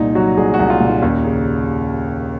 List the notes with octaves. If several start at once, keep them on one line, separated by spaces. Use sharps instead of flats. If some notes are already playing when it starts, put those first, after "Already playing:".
Already playing: C2 A#2 D#4
F#3 F#4
C2 G#4
F#4
C2
F4
A#2
D#4
D#2 C#4
C#3